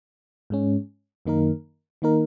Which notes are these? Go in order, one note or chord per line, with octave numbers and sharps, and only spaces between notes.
G#2 G#3 C#4
F#2 D#3 A#3 D#4 A#4
D#3 A#3 D#4 A#4